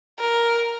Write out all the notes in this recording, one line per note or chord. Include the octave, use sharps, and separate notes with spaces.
A#4